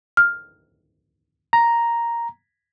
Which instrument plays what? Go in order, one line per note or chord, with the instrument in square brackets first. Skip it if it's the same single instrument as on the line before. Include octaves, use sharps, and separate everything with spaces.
[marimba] F6
[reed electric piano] A#5